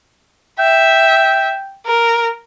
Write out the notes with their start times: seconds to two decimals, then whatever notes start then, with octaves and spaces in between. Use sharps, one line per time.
0.59 E5 G5
1.85 A#4